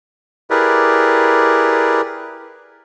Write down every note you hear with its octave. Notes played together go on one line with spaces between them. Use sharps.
E4 G4 G#4 A#4 B4 D5